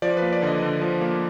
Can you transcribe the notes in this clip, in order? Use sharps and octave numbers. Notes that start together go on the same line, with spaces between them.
F3 D5
B4
A#3
D5
D3 D#5
D3
F3
A#3